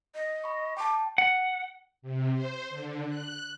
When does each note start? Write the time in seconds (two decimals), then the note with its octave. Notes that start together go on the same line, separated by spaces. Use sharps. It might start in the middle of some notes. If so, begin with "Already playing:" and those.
0.15 D#5
0.44 B5 C#6
0.77 G5 A5 D6
1.18 F#5
2.02 C3
2.33 C5
2.70 D3
3.07 F#6